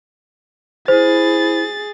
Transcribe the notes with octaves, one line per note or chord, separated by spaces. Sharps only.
E4 G#4 C5 A6